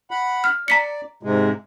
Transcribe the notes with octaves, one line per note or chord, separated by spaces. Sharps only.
F#5 B5
F6
D5 A#5 B6 C#7
G#2 C3 G#3